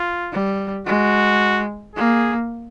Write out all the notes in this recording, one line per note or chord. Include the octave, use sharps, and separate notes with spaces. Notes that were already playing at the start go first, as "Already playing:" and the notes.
Already playing: F4
G3
G#3 F#4
A#3 G#4